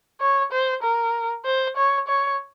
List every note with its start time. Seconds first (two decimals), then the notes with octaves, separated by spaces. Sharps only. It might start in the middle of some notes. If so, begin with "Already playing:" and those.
0.21 C#5
0.52 C5
0.83 A#4
1.46 C5
1.77 C#5
2.08 C#5